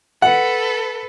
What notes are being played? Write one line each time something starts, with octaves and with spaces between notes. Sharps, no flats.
A4 B4 F#5